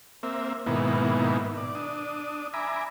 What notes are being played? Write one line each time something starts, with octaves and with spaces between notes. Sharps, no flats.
A#3 C4 E5
G#2 B2 D#3 A#3 B3 E4
D5
D4 D#6
E5 G#5 A#5 B5 D6